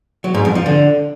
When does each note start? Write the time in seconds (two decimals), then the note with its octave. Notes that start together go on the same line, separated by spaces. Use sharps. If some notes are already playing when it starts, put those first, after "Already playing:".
0.24 F#3
0.35 G#2
0.45 F2
0.55 F3
0.66 D3